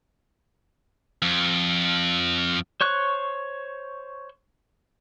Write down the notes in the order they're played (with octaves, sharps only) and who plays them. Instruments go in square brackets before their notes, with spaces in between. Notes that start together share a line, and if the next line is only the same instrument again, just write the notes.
[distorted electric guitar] F2
[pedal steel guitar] C5 C#5 C#6 F#6